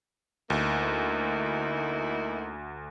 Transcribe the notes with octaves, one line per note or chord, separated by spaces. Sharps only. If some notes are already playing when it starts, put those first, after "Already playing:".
D2 A#3 D#4 E4